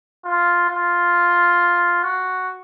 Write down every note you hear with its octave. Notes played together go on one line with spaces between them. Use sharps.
F4
F4
F#4